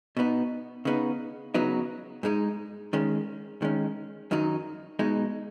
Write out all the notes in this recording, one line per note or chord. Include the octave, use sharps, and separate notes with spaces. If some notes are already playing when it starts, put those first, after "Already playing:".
B2 B3 D#4
C#3 B3 D#4
C#3 F#3 B3 D#4
G#2 G#3 D#4
D#3 G#3 C#4
D#3 G#3 C#4
F#2 D#3 F#3 D#4
B2 G#3 D#4